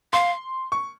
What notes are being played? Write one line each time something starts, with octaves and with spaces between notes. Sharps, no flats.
F5 C6
C#6